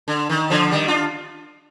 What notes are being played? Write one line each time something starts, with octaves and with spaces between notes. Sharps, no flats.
D3
D#3
D3 F3
D#3 G3
D4 F4